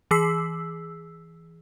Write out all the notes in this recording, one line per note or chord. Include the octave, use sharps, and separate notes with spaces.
E3 G#4 E6 B6 C7